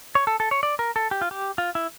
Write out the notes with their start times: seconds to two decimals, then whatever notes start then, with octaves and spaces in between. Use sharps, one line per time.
0.15 C#5
0.27 A4
0.40 A4
0.51 C#5
0.63 D5
0.79 A#4
0.96 A4
1.11 G4
1.21 F4
1.31 G4
1.58 F4
1.75 E4